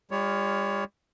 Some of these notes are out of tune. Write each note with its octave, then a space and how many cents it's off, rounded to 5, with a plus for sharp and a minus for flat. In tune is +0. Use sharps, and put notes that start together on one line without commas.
G3 +40 F4 +0 C#5 +15